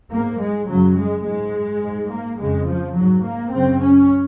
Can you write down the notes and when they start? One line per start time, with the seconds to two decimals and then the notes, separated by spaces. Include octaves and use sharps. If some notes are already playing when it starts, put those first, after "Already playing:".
0.11 G#2 A#3
0.39 G#3
0.68 F#2 C#3 F#3
0.97 G#3
1.25 G#2 G#3
1.82 G#2
2.11 A#3
2.39 F2 C#3 G#3
2.67 F3
2.96 G#2 F#3
3.24 A#3
3.53 F#2 C#3 C4
3.82 C#4